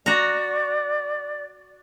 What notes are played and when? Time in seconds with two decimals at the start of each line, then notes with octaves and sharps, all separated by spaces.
0.06 F#4 D5 A#5